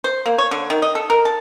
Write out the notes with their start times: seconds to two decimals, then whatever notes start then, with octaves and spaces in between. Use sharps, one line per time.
0.04 C5
0.26 A#3
0.38 C#5
0.51 D3
0.70 D#3
0.82 D#5
0.95 A4
1.10 A#4
1.25 A5